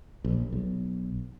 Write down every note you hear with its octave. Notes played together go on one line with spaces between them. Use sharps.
A#1
B1